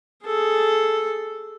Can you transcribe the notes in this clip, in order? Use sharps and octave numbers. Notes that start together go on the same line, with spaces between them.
G#4 A4